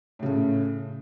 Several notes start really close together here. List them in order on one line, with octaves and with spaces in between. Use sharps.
A2 C#3 A3